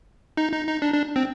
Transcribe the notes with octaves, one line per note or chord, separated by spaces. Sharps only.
D#4
D#4
D#4
D4
D4
C4